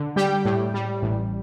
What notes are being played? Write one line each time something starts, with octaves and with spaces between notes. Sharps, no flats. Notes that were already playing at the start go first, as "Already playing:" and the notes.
Already playing: D3
G3 G4 G5
A2
G3
A1